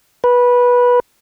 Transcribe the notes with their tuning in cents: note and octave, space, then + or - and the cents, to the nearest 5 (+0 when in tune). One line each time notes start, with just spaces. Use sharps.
B4 -15